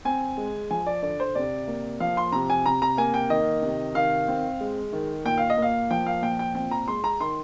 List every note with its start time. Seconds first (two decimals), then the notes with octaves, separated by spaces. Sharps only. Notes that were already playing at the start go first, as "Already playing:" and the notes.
0.05 C4 G#5
0.37 G#3
0.71 F3 G#5
0.86 D5
1.03 D3 D5
1.20 C5
1.35 C3 D5
1.67 A#3
2.00 F3 F5
2.17 C6
2.32 C3 A#5
2.50 G#5
2.66 C3 A#5
2.82 A#5
2.97 A#3 G#5
3.14 G5
3.30 D#3 D#5
3.62 C3
3.95 D#3 F5
4.28 C4
4.61 G#3
4.93 D#3
5.25 A#2 G5
5.38 F5
5.50 D#5
5.57 A#3
5.62 F5
5.91 F3 G5
6.06 F5
6.22 A#2 G5
6.39 G5
6.55 C4 G5
6.71 A#5
6.88 G#3 C6
7.04 A#5
7.21 D#3 C6